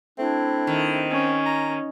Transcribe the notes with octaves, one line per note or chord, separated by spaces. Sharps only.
A3 C4 D4 E4
D#3
C#4
A#5